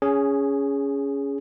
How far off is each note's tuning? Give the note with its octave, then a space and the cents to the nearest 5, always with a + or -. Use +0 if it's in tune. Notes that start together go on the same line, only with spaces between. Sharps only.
C#4 +15 G#4 -5